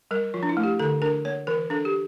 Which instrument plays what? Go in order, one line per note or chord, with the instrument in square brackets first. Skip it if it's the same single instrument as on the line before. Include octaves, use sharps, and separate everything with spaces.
[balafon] G3 A#4
F3 F4
D4
E4
A3
G4
D3 A4
D4 A#4
A#3 C#5
E3 A#4
D4 A4
G4